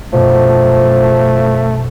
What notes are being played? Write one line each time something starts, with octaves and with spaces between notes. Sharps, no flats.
F#2 B2 F3 A3